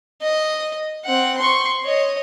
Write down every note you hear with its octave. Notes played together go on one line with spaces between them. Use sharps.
D#5
C4 F#5
C6 C#6
C#5 D#5